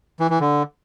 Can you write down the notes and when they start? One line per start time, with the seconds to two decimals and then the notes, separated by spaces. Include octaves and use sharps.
0.20 E3
0.30 E3
0.40 D3